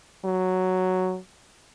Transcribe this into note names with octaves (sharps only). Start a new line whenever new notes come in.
F#3